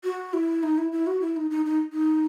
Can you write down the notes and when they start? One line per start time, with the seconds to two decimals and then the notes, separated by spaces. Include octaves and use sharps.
0.04 F#4
0.33 E4
0.63 D#4
0.78 E4
0.92 E4
1.07 F#4
1.21 E4
1.36 D#4
1.51 D#4
1.66 D#4
1.93 D#4